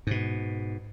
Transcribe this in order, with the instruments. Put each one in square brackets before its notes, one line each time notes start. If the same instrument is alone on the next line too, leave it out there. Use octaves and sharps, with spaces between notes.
[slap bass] G#2 B2